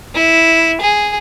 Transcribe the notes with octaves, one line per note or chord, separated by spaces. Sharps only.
E4
G#4